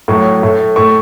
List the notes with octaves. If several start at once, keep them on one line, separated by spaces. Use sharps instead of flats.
A2 F#3 A3 C#6
A2 A3
A2 A3 C#6